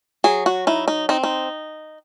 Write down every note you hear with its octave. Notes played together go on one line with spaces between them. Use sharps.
F#3 G#4
F#4
D#4 E4
D#4
C4 D#4
D#4